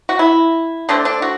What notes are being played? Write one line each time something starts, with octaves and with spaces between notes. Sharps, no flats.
F#4
E4
D3 A3 C4 D4
D4
F#4